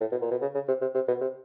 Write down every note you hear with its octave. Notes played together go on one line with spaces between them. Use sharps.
A2
B2
A#2
B2
C#3
C#3
C3
C3
C3
B2
C3